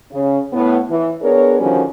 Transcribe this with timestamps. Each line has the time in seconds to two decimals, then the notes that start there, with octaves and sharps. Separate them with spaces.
0.11 C#3
0.53 A2 B3
0.89 E3
1.22 B3 D4 G#4 A#4 C#5
1.59 D3 D#3 F3 G3 C#4 F#4